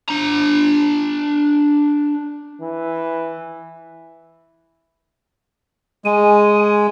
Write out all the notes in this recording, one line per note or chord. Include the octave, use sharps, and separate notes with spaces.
D4 A#5
E3
G#3 G#5